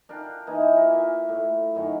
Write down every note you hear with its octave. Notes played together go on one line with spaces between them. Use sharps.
D4 A#4 F5 G5
E3 A#3 D#4 D#5
F4 A#4
E5 G#5
A2
F#2 D#3 F#3